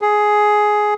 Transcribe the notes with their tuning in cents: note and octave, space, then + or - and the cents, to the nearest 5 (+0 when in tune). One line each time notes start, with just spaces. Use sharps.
G#4 +10